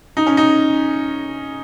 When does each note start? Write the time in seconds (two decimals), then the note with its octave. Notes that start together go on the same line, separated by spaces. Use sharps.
0.17 D#4
0.27 C#4
0.37 D#4